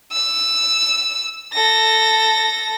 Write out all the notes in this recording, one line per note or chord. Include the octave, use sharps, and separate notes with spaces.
E6
A4 A#6